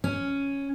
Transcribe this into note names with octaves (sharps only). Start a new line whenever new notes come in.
C#4